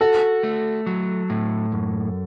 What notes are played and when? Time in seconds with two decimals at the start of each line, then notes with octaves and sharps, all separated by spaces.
0.01 F#4 A4
0.43 A3
0.87 F#3
1.30 A2
1.72 F#2